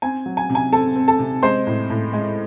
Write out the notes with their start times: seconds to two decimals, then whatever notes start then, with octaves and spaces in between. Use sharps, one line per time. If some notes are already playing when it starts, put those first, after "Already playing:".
0.02 C4 G#5
0.26 F#3
0.37 G#5
0.50 C3
0.55 G#5
0.72 C4 A4 A5
0.96 C4
1.08 A4 A5
1.19 C3
1.43 G#3 C5 C6
1.67 A2
1.90 A2
2.13 G#3